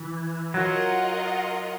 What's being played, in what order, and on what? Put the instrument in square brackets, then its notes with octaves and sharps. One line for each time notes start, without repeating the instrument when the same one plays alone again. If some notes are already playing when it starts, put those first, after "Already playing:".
Already playing: [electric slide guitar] E3
[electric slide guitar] F#3 [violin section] F4 A#4 D#5 F#5